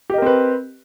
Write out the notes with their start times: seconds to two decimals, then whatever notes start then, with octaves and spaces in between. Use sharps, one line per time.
0.10 G4
0.14 D#5
0.18 A#4
0.22 C4
0.26 B4